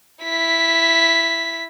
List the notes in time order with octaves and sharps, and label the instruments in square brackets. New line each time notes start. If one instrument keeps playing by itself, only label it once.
[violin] E4 B6